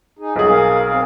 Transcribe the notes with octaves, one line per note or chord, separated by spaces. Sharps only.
D#4 G#4
B1 G3 B3 G#4
A#4 F5
C4 F5